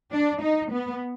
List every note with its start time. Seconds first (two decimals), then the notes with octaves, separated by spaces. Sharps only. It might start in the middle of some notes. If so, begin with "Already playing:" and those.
0.12 D4
0.41 D#4
0.71 B3